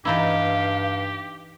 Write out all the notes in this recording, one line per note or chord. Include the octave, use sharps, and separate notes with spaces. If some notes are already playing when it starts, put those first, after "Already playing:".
G2 E3 D#4 E4 G4 F5